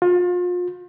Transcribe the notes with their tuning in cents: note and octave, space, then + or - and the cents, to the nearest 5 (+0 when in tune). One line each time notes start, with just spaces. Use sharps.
F4 +35